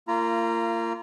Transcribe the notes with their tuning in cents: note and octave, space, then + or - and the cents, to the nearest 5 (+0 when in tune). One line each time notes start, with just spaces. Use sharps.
A#3 -30 F4 -35 A#5 +0